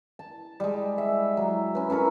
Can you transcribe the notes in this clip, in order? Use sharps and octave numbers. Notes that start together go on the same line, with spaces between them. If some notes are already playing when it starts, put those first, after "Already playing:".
A5
G3 G#3
E5
F#3
C#4 B4
C#4 E4 A4 A#4